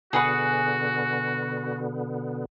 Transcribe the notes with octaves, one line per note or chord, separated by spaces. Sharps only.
B2 D3 B3 F#4 G#4 B4 F#5